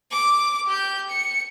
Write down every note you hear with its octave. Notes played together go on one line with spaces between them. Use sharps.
D6
G4 G6
C#7